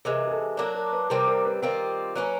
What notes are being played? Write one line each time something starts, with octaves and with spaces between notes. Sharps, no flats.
C3 E3 G#3 A#4
G#4
A4
F#3 A#3 D4 A#4
A#4
B4
C3 E3 G3 C4 A#4
A#4
B4
D#3 G3 C4 F4 A#4
F#3 A#3 C#4 B4